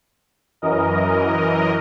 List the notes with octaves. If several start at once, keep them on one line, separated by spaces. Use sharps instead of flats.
F#2 E3 A#4 D#5